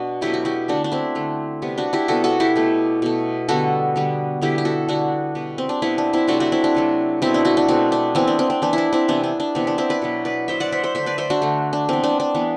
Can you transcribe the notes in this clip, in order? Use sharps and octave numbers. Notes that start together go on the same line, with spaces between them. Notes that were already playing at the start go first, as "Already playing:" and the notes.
Already playing: B2 D4 F#4
B2 F#3 A3 E4 G4
F#4
E4 G4
D3 A3 D4 F#4
D4
C4 E4
D3 A3
C3 G3 B3
D4 F#4
E4 G4
C3 G3 B3 F#4 A4
F#4 A4
E4 G4
B2 A3
B2 A3
D3 G3 B3 F#4 A4
D3 G3 B3
D3 G3 B3 E4 G4
G4
F#4 A4
D3 G3 B3 D4 F#4
B2 G3 B3
C4
D4
B2 G3 B3 C4 E4
D4
C4 E4
C3 F#3 A3 D4 F#4
D4 F#4
C4 E4
D4
C3 F#3 A3
B2 A3 C4 E4
D4
D4 F#4
D4
B2 A3 C4
D4
E3 B3 C4 E4
D4
C4
C4
E3 B3 D4
E4
D4
C4 E4
C3 E3 B3 D4
D4
D4
C3 E3 B3 C4
D4
C4 E4
B4 D5
B2 F#3 B3
B4 D5
B2 F#3 B3 C5 E5
D5 F#5
C5 E5
C5 E5
D3 A3 C5 E5
B4 D5
C5 E5
D4 F#4
D3 A3
D4
E3 B3 C4
D4
D4
E3 B3